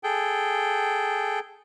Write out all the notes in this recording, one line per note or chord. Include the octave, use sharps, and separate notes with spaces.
G#4 A4 G5